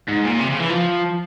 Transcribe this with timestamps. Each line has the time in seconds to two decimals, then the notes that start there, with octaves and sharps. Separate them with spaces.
0.08 G#2
0.25 A#2
0.39 C3
0.50 C#3
0.59 E3
0.70 F3